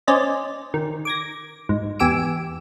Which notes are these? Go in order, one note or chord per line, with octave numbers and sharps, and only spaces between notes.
C#4 C5 D5 D#5
D#3
D6 G#6 A#6
G#2
E2 G4 G#5 D6 E6 D7